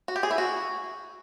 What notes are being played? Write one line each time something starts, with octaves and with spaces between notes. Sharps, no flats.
F#4
G4
G#4
E4
F#4